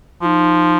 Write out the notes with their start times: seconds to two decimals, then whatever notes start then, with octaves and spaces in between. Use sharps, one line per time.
0.22 F3 D#4 F4